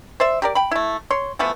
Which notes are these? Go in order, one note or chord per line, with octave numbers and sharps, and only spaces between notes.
C5 D5 E5
G4 A#4 D5
G5 B5
A3 E4
C#5 C6
E3 F3 A3 B3